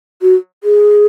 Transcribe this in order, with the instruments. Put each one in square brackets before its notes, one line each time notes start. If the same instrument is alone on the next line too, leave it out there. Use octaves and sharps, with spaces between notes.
[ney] F#4
G#4